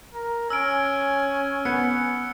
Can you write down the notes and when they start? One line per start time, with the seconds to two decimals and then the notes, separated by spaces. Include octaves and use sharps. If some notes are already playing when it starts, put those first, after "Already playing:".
0.14 A#4
0.50 C#4 G#5 E6 F6 D7
1.65 B3 C#7